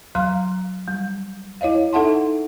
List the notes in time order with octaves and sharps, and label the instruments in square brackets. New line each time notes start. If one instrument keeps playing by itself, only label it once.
[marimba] F#3 F5 A#5 C6 F6
G3
E4 C#5 D#5 F5
D#4 A4 E5 F#5 A5 C6